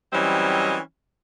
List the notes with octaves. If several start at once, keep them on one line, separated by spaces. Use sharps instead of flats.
E3 F#3 G3 C4 C#4 D#5